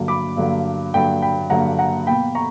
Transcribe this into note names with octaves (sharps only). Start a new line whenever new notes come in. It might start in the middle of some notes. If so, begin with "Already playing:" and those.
Already playing: G2 D3 F#3 A#3
B5 D6
G2 D3 F#3 A#3
G2 D3 F#3 A#3 G5 B5
G5 B5
G2 D3 F#3 A#3 F#5 A#5
F#5 A#5
B2 A#3 G5 B5
A#5 C#6